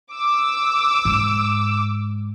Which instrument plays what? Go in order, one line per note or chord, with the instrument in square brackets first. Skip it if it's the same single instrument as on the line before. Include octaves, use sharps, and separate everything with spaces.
[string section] D6 E6
[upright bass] G#2